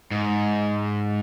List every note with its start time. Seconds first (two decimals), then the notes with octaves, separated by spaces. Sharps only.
0.11 G#2